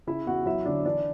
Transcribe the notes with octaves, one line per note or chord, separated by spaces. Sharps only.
C#3 E4 E5
E2 F#4 F#5
F#3 E4 E5
D3 D4 D5
E3 D4 D5